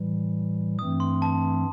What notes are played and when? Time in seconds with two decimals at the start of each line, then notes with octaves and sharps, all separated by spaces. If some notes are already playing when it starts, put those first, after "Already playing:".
Already playing: A2 E3 G3
0.79 G2 E3 A3 C4 D#6
1.00 C6
1.22 A5